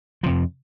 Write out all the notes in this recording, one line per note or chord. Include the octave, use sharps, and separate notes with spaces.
F2 C3 F3